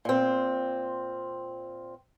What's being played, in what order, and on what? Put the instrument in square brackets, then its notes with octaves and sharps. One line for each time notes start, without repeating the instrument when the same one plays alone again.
[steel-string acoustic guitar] A#2 C4